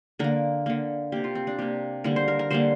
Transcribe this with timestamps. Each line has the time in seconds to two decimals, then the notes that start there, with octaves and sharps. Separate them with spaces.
0.19 D3 A#3 A#4
0.66 D3 A#3
1.12 C3 A#3 G4
1.24 F4
1.35 C4
1.47 D4
1.59 C3 A#3 G4
2.04 D3 G3 A#3 A#4
2.16 C5
2.28 A#4
2.39 A#4
2.50 D3 G3 A#3 C5